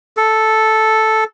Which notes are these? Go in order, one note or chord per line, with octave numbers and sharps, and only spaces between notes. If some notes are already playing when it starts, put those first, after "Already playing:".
A4